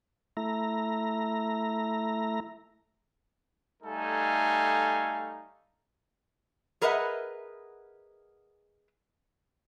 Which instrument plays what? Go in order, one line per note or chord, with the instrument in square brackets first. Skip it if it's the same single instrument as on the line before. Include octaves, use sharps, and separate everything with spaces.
[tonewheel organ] A3 E4 A#5
[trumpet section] G3 A3 D#4 A4 F5 G#5
[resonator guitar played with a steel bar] G#4 A#4 B4 D#5 E5 F#5